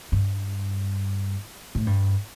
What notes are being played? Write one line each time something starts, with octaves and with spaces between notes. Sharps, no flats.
G2
A2
G2